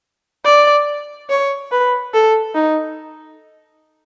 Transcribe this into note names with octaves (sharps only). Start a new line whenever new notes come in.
D5
C#5
B4
A4
D#4